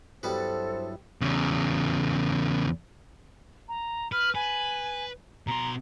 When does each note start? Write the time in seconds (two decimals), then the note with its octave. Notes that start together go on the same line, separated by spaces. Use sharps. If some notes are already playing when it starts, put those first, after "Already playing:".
0.23 G2 F#3 G3 B3 E4 F#4 A4 C5
1.21 E2 C#3
3.69 A#5
4.12 B4 F6
4.35 B4 G#5
5.47 B2 A#5 C6